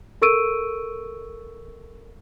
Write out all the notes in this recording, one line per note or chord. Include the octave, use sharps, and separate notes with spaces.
A4 A#4 C#6 E6 D7 D#7